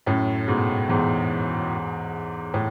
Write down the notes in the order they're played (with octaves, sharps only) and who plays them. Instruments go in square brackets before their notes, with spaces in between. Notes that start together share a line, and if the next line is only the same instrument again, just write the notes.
[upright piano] F#2 A2
G#2 B2
E2 G#2
A2